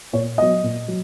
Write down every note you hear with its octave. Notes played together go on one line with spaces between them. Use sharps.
A#2 C#5
F#3 B3 D#5
A#2
F#3